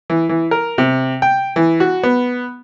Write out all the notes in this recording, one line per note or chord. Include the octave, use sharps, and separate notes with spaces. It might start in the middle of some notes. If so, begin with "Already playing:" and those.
E3
E3
A#4
C3
G5
E3
F#4
B3